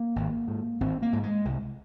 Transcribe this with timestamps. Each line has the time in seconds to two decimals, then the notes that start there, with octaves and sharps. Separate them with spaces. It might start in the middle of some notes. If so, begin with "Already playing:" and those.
Already playing: A#3
0.16 G#1
0.48 G#2
0.81 G#1 C4
1.02 A#3
1.13 G#2
1.23 G#3
1.45 C2